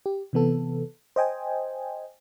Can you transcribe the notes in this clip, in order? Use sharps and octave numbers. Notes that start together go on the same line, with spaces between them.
G4
C3 E3 B3 A4
C5 D#5 G5 G#5